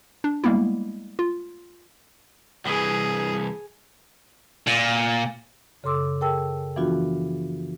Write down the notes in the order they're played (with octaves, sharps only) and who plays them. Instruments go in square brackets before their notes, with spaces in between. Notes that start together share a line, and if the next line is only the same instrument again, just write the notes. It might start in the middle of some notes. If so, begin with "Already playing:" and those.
[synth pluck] D4
G3 G#3 A#3 B3 E4
F4
[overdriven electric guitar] C2 E3 [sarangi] G#4
[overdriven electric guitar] A#2
[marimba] F#2 C#3 A4 C6 D6 E6
G#4 A#4 G5 A5 E6
E3 F3 B3 D4 F4 F#4